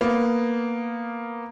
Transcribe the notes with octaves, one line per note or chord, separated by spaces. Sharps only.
A#3 B3